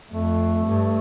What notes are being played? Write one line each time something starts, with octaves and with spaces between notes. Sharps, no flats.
F2 A3
G2